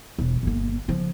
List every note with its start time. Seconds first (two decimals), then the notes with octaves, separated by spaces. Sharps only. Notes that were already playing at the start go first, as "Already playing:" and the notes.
0.19 E1
0.43 G1 A#3
0.88 C#3 F3